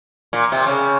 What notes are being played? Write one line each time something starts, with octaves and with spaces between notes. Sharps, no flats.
A#2
C3
C#3